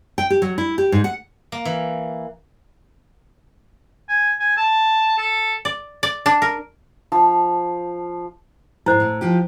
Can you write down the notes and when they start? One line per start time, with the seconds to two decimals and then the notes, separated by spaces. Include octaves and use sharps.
0.18 G5
0.30 G4
0.42 F#3
0.58 E4
0.78 G4
0.92 G#2
1.04 F#5
1.52 A#3
1.65 E3
4.09 G#5
4.40 G#5
4.57 A5
5.18 A4
5.65 D5
6.03 D5
6.26 D4
6.42 A#4
7.12 F3
8.86 G#2 G#3 E4 C5
9.00 A2
9.21 F3 F4 G4